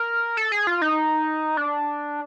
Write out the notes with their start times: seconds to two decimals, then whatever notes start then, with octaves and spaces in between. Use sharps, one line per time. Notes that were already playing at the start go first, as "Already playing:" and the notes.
Already playing: A#4
0.37 A4
0.52 G#4
0.67 F4
0.82 D#4
1.57 D4